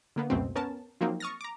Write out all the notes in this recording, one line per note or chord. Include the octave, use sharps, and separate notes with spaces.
D3 A#3 B3
C#2 F#2 B2 A3 C4
B3 C#4 A#4 A5
F3 F#3 A#3 C4 D#4
C#6 D#6 F6 A6 A#6
A#5 D6